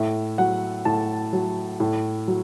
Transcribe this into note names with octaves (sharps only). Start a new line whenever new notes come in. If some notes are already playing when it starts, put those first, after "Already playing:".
Already playing: A2 E5
F#3 F#5
A2 A5
F#3
A2
F#3